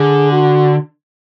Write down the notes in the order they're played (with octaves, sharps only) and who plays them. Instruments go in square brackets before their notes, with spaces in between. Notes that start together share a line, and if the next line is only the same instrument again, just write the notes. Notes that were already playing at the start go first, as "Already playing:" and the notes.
Already playing: [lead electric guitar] D3 [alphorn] G#4
[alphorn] F#4